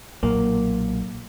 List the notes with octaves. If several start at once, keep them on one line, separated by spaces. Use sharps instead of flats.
B1 A#2 F#3 A#3